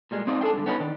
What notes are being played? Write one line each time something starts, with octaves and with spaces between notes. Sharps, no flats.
A#2 G3 G#3
C4 D#4 F4 D5
D4 G#4 A4 F5 G5
G2 D3
B3 C#4 D#4 F#4 G4 B4
D#3 D4